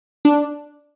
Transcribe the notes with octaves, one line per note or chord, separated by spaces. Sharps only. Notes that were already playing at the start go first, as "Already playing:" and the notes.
D4